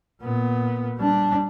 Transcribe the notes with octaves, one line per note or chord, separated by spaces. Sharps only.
A#2 B3
G3 D4